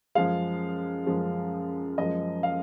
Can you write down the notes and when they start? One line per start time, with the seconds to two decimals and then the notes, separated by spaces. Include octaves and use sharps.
0.15 F#2 F3 G#3 F5
1.06 F#2 F3 G#3
1.98 F#2 F3 G#3 D#5
2.43 F5